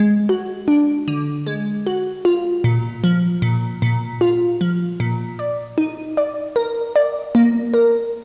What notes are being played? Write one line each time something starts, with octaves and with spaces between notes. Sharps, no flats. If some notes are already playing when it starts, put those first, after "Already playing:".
Already playing: G#3
F#4
D4
D3
G#3
F#4
F4
A#2
F3
A#2
A#2
F4
F3
A#2
D5
D#4
D5
A#4
D5
A#3
A#4